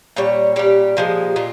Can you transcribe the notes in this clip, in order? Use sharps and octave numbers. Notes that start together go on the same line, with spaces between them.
A#2 G3 C#5
A#2 G3 G4
A#2 F3 G#3
A#2 F4